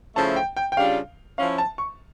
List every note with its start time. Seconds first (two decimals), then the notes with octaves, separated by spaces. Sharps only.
0.16 C#3 F3 A3 E4 A5
0.36 G5
0.57 G5
0.72 G5
0.77 C#3 G3 D4 F4 F5
1.38 F3 C#4 E4 F5
1.58 A5
1.78 C#6